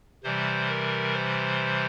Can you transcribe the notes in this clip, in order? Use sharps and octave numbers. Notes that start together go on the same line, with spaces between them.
C3 E3 G3 C5
A#4
C5